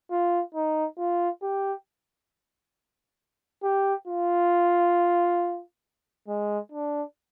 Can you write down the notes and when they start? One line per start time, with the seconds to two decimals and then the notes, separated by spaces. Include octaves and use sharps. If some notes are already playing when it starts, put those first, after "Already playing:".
0.11 F4
0.54 D#4
0.98 F4
1.42 G4
3.63 G4
4.07 F4
6.28 G#3
6.72 D4